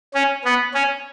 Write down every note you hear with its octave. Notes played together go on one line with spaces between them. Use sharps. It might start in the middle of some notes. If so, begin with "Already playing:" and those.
C#4
B3
C#4